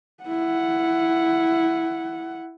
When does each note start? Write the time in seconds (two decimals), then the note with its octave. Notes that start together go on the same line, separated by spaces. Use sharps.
0.24 E4 F#5